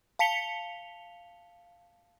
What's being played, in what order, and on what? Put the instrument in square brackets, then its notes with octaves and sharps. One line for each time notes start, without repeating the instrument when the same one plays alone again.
[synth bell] F5 A5 B6 C#7 F7 G7